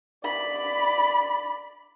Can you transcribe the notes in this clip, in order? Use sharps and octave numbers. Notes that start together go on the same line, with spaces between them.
D5 B5